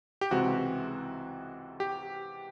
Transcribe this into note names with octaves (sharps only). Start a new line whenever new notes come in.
G4
C#2 C3 E3 G#3 C4 F#4
G4